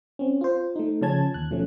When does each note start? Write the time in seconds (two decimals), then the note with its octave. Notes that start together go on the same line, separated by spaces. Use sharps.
0.19 C4 C#4
0.41 F4 C5
0.76 A3 D#4
1.01 C#3 F3 C#4 A5 G#6
1.34 D#2 F#6
1.51 B2 F3 A3 C#4